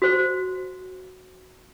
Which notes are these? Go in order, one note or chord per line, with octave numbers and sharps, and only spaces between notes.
F#4 C5